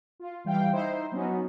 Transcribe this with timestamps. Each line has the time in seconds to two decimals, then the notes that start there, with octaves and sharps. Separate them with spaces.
0.20 F4
0.44 E3 G3 F5 G5
0.72 D#4 E4 C5
1.12 F#3 B3 C#4 D#4 F#4